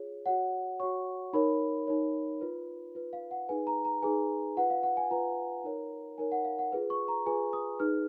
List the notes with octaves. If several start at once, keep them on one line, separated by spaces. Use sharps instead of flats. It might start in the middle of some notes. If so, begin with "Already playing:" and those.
Already playing: F4 G#4 C#5
F#4 C#5 F#5
F#4 C#5 C#6
D#4 A#4 C#5 B5
D#4 A#4 C#5
F4 B4
F4 B4
F5
F#5
D#4 G#4 B4 G#5
A#5
A#5
D#4 G#4 B4 G#5
F4 B4 F#5
F5
F#5
G#5
F4 B4 A#5
D#4 A#4 C#5
D#4 A#4 C#5 G#5
F#5
F5
F#5
F4 G#4 B4
C#6
A#5
F4 G#4 B4 G#5
D#6
D#4 G#4 B4 F6